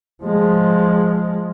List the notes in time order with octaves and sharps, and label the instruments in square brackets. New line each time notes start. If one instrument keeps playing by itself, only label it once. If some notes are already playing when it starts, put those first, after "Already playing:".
[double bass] F3 G#3